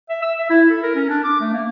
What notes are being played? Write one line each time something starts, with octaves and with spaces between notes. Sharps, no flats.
E5
E6
E5
E4
A4
A#4
C#4
D4
D6
A3
A#3